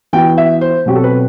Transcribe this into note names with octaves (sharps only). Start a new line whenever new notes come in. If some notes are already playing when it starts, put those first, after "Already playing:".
E3 B3 F#4 G5
E5
C5
B2 F#3 C4 F#4 G4
A4
B4